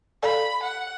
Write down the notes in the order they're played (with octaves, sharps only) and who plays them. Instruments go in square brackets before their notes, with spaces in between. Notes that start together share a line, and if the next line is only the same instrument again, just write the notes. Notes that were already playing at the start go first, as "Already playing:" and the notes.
[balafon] A4 D5 F5 [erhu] B5
[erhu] F#5